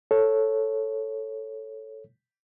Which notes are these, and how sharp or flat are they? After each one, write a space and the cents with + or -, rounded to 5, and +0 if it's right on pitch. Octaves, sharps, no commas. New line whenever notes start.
A4 +0 C#5 -10